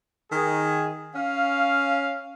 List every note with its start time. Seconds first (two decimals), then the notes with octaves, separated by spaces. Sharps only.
0.32 D#3 G#4
1.16 C#4 F5